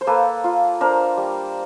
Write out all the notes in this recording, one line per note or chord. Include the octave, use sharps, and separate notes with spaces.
C5
A#3 A4 B4
F4
D4 A#4 C5
G3